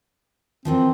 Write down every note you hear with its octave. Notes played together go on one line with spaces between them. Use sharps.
F#2 E3 F3 C4